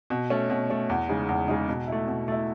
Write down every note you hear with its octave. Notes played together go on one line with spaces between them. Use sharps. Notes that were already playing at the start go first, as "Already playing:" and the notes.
B2
A3 C#4
B2
A3 C#4
E2
C#3 G#3 D#4
E2
C#3 G#3 D#4
B2
A3 E4
B2
A3 E4